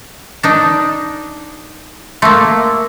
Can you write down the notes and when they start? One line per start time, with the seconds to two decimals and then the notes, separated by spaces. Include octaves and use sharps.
0.43 D4 D#4
2.22 A3 A#3 C6 E6